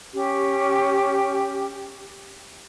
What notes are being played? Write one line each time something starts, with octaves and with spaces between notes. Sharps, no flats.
C#4 G4